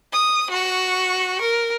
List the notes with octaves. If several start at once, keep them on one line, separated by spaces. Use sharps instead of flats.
D#6
F#4 C#6
A#4